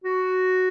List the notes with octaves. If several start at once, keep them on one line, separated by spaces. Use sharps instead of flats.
F#4